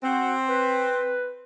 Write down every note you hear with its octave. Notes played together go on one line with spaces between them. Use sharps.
C4 F#4 F#5
B4